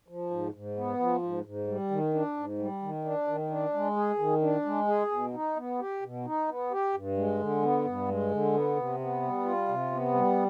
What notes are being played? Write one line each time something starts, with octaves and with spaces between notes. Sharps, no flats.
F3
G#2
G#2
B3
F3
G#2
G#2
G3
D#3
D4
G#2
G3
D#3
D4
D#3
D4
G#3
G#4
D#3
D4
G#3
G#4
B2
D#4
B3
G4
B2
D#4
B3
G4
G2
G#3
D3
B3
G2
G#3
D3
B3
C3
B3
G3
F4
C3
B3
G3